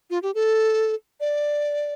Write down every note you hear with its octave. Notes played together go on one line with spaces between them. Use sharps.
F4
G4
A4
D5